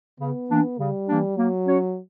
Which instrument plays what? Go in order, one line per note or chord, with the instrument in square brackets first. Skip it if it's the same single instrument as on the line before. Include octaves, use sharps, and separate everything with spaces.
[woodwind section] C#3 [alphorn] B3
[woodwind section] E3 A#3 D4
[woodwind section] C#3 [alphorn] G3
[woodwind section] E3 A#3 D4
[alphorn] F#3 [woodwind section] A#3
[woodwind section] C#4 F#4 C#5